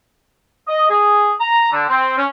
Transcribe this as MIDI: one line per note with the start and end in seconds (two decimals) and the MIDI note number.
0.68 0.90 75
0.90 1.31 68
1.40 1.69 82
1.71 1.83 50
1.89 2.14 60
2.18 2.26 61